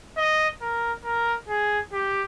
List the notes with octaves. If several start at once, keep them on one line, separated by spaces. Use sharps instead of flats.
D#5
A#4
A#4
G#4
G4